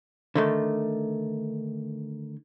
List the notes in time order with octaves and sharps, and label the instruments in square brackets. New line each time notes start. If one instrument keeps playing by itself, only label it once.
[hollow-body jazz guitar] D3 D#3 A3